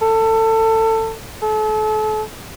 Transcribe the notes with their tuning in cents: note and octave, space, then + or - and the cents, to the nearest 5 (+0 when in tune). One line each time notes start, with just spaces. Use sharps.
A4 +25
A4 -35